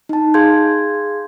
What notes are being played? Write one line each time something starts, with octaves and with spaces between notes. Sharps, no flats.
D#4 A5
G#4 F5 C6 G6 G#6